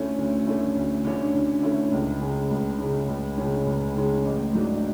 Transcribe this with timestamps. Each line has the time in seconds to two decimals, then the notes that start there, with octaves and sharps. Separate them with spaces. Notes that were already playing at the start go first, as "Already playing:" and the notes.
Already playing: D2 D3 A3 C#4 E4
0.18 D2
0.47 D3 A3 C#4 E4
0.76 D2
1.05 D3 A3 C#4 E4
1.34 D2
1.63 D3 A3 C#4 E4
1.92 C#2
2.21 C#3 G#3 C#4
2.51 C#2
2.79 C#3 G#3 C#4
3.08 C#2
3.38 C#3 G#3 C#4
3.66 C#2
3.95 C#3 G#3 C#4
4.25 A1
4.53 G#2 F#3 A3 D4